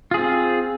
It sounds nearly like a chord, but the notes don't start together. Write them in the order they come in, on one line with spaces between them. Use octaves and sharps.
F4 G#4 C4